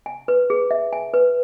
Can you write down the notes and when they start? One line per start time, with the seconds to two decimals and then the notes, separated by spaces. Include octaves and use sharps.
0.06 G#5
0.28 B4
0.50 G#4
0.71 E5
0.93 G#5
1.14 B4